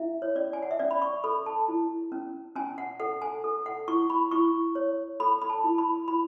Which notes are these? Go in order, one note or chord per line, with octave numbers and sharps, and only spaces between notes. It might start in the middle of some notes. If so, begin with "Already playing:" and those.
Already playing: E4 E5
C#5
C#4 D5
G#5
F#5
E5
C#4 D5
B5
C#6
A4 B5
A5
E4
C#4
C#4 G#5
F#5
A4 F#5
G#5
A4
F#5
E4 C#6
B5
E4 C#6
C#5
A4 B5
B5
A5
E4
B5
E4 B5